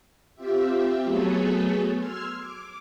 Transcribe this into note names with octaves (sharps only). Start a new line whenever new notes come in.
C4 F4 G4 E5
F#3 A3 B3 G#4 A4 C#5
C6 E6 F6 G#6
D6